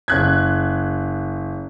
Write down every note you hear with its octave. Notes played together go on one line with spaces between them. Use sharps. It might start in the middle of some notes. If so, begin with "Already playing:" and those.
F#1 F#6 G#6